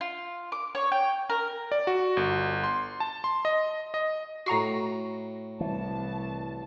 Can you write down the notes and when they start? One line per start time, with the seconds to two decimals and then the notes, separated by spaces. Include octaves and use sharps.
0.01 F4
0.52 D6
0.75 C#5
0.92 G5
1.29 A#4
1.72 D5
1.87 F#4
2.17 G1
2.64 C6
3.00 A5
3.24 C6
3.45 D#5
3.94 D#5
4.46 A2 F#4 A#5 C#6 C7
5.61 C2 E3 A5